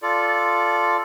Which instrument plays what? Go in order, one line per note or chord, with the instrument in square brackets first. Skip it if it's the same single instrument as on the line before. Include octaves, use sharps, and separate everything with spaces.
[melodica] F4 A4 D5